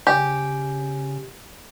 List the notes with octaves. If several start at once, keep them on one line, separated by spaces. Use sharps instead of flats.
C#3 G4 G#5